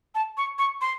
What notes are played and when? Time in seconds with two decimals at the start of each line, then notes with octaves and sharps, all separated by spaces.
0.15 A5
0.37 C#6
0.58 C#6
0.81 C6